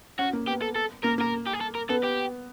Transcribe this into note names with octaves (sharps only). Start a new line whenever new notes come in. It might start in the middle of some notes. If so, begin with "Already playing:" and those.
C#4 F#4
A#3
B3 G4
A4
A4
A#3 A#4
A#3 A#4
G4
G#4
A4
A#4
B3 A4
G4